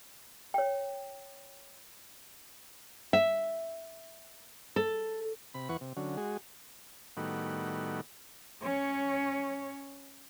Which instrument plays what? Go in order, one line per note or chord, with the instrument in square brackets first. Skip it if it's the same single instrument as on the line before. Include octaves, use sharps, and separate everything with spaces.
[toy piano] C#5 G5
[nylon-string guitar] E5
A4
[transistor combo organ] C3 B5
E2 E3 B4 F#5 C#6
C3
D3 F#3 C#4
G#3 F#4 G#4
A2 D#3 G3 B3 F#4
[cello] C#4 C#5